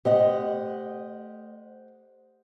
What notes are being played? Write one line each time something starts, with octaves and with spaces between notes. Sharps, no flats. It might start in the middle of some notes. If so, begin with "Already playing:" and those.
A3 G4 C5 D#5 F#5